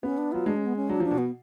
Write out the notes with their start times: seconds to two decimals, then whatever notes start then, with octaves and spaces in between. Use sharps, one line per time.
0.03 B3 C#4
0.18 D4
0.32 F#3 F4
0.46 G#3 D4
0.56 C#4
0.66 B3
0.76 C#4
0.89 F#3 D4
1.00 F3 D4
1.11 B2
1.18 B3